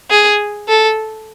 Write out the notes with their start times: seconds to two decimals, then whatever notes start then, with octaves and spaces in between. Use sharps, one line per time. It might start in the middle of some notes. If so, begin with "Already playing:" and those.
0.10 G#4
0.69 A4